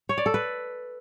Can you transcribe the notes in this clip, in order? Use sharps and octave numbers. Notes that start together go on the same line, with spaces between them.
C#5
D5
A4
B4